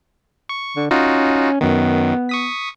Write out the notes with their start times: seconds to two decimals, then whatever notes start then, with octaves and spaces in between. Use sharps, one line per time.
0.49 C#6
0.76 D3
0.91 C#4 D#4 F4 F#4
1.61 F#2 D#3 B3
2.29 C#6 D#6 B6